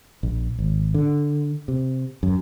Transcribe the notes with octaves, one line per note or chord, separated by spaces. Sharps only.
A#1
G#1
D3
C3
F#2